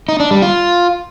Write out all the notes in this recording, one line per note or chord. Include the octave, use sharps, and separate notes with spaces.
D#4
D4
G3
F4